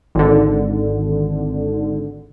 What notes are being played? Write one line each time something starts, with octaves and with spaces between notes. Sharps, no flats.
G#1 D3